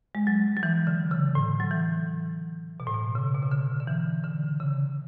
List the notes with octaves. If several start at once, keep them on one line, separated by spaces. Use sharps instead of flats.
G#3
F#3
F#3
E3
D3
C#3
A2
F#3
E3
B2
A2
B2
C#3
B2
C#3
D3
D3
E3
D3
C#3